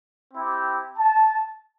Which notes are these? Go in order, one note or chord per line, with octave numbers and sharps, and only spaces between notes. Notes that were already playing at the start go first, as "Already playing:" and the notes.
C4 E4 G4
A5